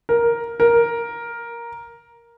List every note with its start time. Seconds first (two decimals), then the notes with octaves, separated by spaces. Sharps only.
0.09 A#4
0.60 A#4